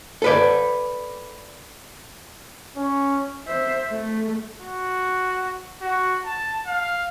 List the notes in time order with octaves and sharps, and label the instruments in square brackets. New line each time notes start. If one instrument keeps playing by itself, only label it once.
[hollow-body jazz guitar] A4 B4 D5
[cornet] C#4
[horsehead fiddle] C5 E5
A3
[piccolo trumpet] F#4
F#4
A5
F5